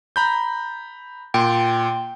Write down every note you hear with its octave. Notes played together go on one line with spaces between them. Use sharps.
A#5 B5 G6
A#2 G5 C6